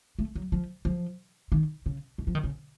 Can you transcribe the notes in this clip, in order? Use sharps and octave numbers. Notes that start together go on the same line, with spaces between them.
A3
F#3
F3
F3
D#3
C#3
D#3
F3
D#3
C#3